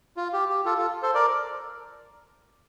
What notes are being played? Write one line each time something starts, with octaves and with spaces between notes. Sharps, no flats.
F4
G4
G4
F4 A4
F4 A4
A4 C5
A#4 D5